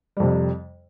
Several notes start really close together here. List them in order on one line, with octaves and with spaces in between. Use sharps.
G3 F2 C3